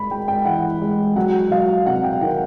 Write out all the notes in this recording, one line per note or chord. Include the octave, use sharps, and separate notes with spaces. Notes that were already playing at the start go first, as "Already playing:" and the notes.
Already playing: G#3 B5
G#3 G5
G5
E3 F#5
G#3
F#3 F#5
F#3 F5
C3 F#5
G5
D#3 F#5